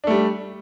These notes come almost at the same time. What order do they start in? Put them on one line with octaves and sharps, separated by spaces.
D4 A3 G3